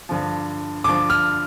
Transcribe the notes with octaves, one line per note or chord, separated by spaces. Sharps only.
G2 D3 F3
G2 D3 F3 D6
F6